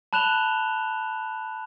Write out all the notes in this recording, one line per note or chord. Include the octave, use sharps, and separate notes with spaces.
A5 B5 F#6 E7 F7 G7